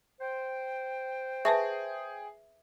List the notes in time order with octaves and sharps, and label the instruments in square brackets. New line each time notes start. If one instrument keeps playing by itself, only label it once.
[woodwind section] C5 G5
[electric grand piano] G#4 [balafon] B4 A5 C#6 [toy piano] E5